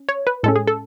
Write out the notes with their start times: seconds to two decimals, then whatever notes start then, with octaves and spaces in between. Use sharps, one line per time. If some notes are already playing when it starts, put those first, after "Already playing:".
Already playing: C#4
0.09 C#5
0.27 B4
0.43 A2 G#3 C#4 A4
0.56 G#4
0.67 A4